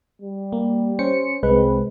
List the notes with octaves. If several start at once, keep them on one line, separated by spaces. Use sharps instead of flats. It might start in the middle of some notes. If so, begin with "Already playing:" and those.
G3
A#3
C#4 C5 C#7
C2 G#3 C4 B4